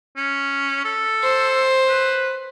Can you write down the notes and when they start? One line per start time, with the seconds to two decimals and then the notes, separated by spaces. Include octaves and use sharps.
0.17 C#4
0.85 A4
1.23 C5
1.88 B4